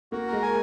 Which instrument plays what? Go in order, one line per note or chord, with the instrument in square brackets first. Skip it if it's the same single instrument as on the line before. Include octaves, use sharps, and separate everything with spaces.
[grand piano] A#3 [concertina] F#4
[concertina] A#4
[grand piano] G#3
[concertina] G#5